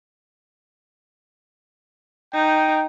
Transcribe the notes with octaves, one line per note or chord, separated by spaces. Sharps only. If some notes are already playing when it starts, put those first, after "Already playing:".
D#4 G5